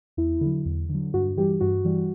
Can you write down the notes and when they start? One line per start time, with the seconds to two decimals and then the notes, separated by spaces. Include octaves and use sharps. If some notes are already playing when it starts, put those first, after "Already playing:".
0.17 E2 E4
0.41 D3 F#3
0.66 E2
0.90 D3 F#3
1.14 G2 F#4
1.37 E3 G3 G4
1.61 G2 F#4
1.85 E3 G3